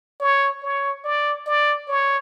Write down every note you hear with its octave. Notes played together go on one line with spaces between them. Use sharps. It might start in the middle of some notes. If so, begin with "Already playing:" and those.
C#5
C#5
D5
D5
C#5